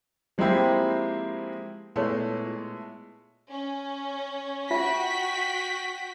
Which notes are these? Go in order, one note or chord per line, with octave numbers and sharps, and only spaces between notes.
F3 G#3 A#3 C4 E4 G4
A#2 G#3 A3 B3 E4 C#5 E5
C#4
F4 F#4 E5 G5 B6